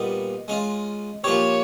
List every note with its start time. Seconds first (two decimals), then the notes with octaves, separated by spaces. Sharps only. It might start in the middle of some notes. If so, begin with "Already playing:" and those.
Already playing: A#2 G3 B3 D#4
0.48 G#3 C#4 F4
1.24 A#2 F3 A#3 D4 G4 C#5